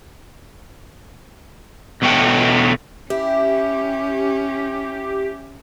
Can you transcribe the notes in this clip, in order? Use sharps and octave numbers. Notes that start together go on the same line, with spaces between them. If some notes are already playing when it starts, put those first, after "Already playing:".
E2 B2 A3 C#5 G5
C#4 E4 G4